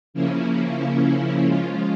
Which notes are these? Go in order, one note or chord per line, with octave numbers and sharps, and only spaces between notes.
C#3 F3 A#3 C#4 E4
C#3 F3 G#3 C#4 F4